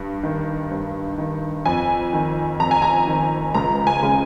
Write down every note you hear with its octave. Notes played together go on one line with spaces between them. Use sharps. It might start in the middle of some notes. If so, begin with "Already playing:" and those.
Already playing: G2
D#3
G2
D#3
F2 G#5
D#3
F2 A#5
G#5
A#5
D#3
C#2 A#5
G#5
C#3